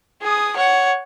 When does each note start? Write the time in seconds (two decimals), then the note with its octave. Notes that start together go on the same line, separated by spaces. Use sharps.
0.22 G#4 D#6
0.57 C#5 F#5